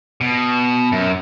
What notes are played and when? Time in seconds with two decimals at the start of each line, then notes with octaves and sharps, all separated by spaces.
0.21 B2
0.92 F#2